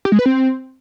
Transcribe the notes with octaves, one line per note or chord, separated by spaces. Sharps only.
G4
G#3
B4
C4